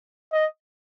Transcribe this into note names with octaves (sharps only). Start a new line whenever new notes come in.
D#5